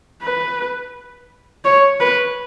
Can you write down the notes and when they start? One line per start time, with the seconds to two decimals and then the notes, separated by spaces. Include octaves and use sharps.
0.23 B4
1.65 C#5
2.00 B4